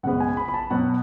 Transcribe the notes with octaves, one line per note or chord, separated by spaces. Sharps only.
F#2 C#3 G#3 B3 F#5
G#5
B5
B5
A5
B2 F#3 B3 F#5